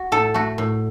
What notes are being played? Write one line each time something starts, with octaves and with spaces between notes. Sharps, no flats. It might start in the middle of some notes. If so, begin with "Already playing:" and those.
Already playing: F#4
A2 A4
A3 F#4
A2